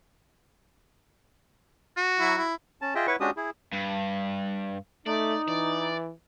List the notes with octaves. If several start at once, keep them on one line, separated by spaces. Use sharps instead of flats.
F#4
F#3 E4
E4
C#4 A5
F4 G#4 D#5 E5 G5
E4 B4 C#5 F#5 C#6
G#3 C#4 D4 F#4 G4 D#6
E4 G#4
G2
A3 D#4 D5
E3 D5